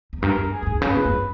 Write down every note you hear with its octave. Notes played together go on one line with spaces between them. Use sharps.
E2
G2 A#4
E2
G#4
G2
G#2
C#3 B4
A#2
G2